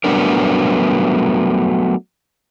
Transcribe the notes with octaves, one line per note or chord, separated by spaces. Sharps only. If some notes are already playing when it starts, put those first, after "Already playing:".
F#3 G3 A3 B3 D4 A#4